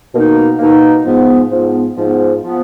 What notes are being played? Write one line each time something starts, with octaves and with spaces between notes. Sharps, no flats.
B2 A#3 D#4
B2 A#3 D#4
G#2 F3 B3
G#2 F3 B3
G#2 F3 B3
F3 B3